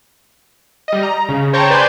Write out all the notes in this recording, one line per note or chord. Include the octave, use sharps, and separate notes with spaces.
G3 D#5
A#5
C#3
C5 C#5 G5 A5 A#5 C#6
B4 C5 D5 G#5 C6 G6